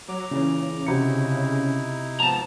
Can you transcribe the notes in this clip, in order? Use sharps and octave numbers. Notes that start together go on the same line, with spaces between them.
F#3 A#5 D6
A#2 C#3 E3
C3 D#4 E4 F#4 C#7
G#2 F3 B3 A5 A#5